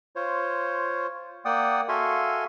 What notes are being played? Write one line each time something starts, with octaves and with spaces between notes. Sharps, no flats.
F4 C5 C#5
A#3 D5 F#5 G5 D#6
F#4 A4 E5 F5 G#5 C6